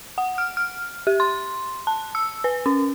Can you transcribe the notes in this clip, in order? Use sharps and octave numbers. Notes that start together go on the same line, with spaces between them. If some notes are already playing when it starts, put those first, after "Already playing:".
F#5
F6
F6
G4
C6
A5
E6
B4
C#4